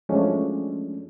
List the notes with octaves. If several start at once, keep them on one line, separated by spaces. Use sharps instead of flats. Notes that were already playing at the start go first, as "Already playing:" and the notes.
F3 F#3 G#3 A3 C#4 D4